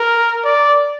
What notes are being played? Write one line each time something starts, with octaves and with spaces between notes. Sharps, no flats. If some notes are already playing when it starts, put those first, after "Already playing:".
Already playing: A#4
D5